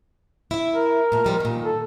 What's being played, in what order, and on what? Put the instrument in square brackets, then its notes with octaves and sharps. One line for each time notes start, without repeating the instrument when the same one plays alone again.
[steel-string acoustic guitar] E4 E5
[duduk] A#4
[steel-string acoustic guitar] A#2 A3
F3 G3 G#3
A#2 D#3
[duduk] A4